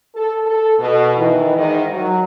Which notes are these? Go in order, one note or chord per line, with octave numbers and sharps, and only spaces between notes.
A4
A4
B2
D#3 E3
G#2 D#3 D#5
F#3